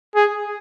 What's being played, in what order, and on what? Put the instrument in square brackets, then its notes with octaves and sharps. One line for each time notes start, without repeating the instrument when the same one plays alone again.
[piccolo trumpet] G#4